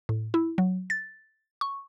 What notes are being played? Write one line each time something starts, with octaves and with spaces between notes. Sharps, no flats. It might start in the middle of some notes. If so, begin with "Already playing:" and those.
A2
E4
F#3
A6
C#6